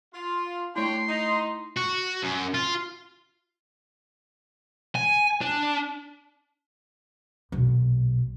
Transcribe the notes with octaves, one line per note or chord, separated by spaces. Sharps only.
F4
A3 D4 E4 C#5 G5 C6
D#4
F#4
F#2
F4
G#5
D4
B1 A#2